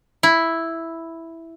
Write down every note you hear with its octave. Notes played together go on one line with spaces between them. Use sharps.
E4